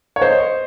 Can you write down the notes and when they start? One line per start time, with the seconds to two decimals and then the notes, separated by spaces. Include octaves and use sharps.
0.16 C#5
0.22 C5 D#5